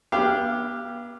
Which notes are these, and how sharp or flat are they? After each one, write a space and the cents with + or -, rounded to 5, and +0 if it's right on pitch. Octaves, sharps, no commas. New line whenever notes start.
B3 -40 G4 +0 F5 -30